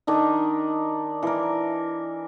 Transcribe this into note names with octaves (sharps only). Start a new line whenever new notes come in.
D#3 D4 D#4
E3 A#4